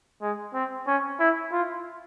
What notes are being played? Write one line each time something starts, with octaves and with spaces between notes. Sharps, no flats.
G#3
C4
C#4
E4
F4